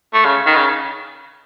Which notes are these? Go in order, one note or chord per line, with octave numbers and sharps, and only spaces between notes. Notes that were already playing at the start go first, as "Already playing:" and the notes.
A3
C#3
D#3
C#3